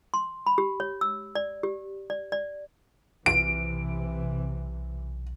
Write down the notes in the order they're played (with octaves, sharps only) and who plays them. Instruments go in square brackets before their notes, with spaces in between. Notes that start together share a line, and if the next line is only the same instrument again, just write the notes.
[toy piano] C6
B5
G4
C#5
E6
D5
G4
D5
D5
[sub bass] B1 [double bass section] C3 E3 [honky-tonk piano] D7